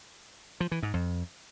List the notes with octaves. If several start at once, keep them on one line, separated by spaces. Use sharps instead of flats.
F3
E3
G#2
F2